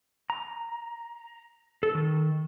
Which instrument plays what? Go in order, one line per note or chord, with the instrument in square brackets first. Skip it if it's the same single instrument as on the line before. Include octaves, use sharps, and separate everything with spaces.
[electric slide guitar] A#5
A4
D#3